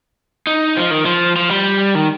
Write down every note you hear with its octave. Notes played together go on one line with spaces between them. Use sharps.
D#4
F3
D#3
F3
F3
G3
D#3